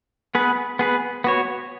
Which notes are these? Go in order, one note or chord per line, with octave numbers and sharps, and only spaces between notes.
B3 G#4 B4
B3 G#4 B4
B3 F#4 C#5